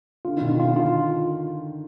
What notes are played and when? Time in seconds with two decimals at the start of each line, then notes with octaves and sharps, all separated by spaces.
0.25 D3 F4
0.37 D#3
0.42 B2
0.48 D#3
0.59 D3 F4
0.70 D3
0.76 F4